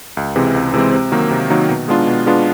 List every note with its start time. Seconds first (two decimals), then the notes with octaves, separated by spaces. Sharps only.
0.17 C#2
0.36 C3 E3 G#3 C4
0.54 C#2
0.74 C3 E3 G#3 C4
0.92 C3
1.12 D#3 F#3 A#3 D#4
1.31 C3
1.50 D#3 F#3 A#3 D#4
1.69 B2
1.88 G#3 B3 D4 F4
2.07 B2
2.26 G#3 B3 D4 F4